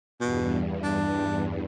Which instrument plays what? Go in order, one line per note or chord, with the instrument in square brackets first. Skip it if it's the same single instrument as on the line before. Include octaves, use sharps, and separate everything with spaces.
[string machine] E2 G2 [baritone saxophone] B2
[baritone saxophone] D4